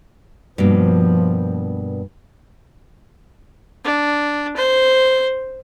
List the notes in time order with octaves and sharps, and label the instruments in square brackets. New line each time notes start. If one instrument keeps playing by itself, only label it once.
[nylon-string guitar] G2 B2 A#3 [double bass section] F3
[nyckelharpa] D4
C5